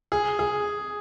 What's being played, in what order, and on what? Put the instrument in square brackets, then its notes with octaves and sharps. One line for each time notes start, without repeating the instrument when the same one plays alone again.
[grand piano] G#4
G#4